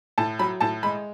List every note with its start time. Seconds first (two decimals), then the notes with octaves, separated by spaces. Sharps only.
0.18 A2 A5
0.39 F#3 B5
0.60 A2 A5
0.83 G#3 B5